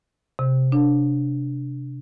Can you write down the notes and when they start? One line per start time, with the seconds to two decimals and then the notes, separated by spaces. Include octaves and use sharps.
0.39 C3
0.72 D4